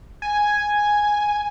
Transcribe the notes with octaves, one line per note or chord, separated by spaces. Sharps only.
G#5